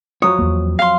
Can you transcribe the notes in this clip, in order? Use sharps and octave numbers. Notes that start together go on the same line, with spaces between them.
F2 F#3 C#5 D#6
E2 A#3
F5 C6